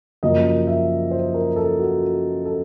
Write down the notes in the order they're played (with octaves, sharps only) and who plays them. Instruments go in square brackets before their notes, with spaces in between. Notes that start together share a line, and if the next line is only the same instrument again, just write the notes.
[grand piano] F#2 C#3 F3 A#3 D#5
E5
C5
A#4
A4
F#4
A4